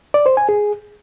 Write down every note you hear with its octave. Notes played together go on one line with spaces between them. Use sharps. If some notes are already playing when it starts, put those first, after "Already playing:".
D5
C5
G#5
G#4